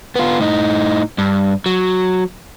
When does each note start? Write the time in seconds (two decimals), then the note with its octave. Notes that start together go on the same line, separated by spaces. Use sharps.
0.16 B3 F4
0.40 A2 D#4
1.18 G2
1.66 F#3